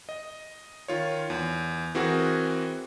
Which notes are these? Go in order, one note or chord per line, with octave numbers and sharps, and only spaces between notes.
D#5
D#3 F4 C#5
E2
E3 C4 F#4 G#4 A#4